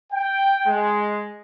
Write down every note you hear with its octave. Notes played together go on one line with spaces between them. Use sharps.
G5
G#3